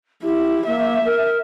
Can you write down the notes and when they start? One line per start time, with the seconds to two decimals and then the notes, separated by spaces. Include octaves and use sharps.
0.23 E4 G4
0.67 A#3 E5
1.05 A#4